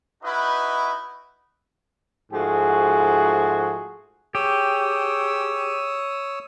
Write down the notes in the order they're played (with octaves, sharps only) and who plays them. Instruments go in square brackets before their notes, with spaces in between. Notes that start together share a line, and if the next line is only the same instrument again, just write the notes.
[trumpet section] D#4 E4 F#4 B4 D#5
[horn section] G#2 F3 A3 F#4 G#4
[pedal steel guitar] G4 [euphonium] G#4 [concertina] C#5 D#6 E6